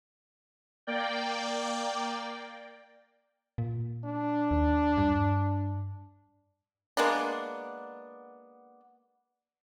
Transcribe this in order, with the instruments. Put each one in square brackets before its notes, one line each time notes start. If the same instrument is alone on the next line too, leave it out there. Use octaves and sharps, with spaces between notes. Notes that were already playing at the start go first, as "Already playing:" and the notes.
[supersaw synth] A#3 D5 G5
[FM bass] A#2
[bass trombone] D4
[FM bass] D#2
G2
[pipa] G#3 A#3 B3 D4